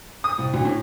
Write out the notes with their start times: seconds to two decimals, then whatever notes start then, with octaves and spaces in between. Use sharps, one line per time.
0.24 D#6
0.38 C2
0.54 D2
0.65 A2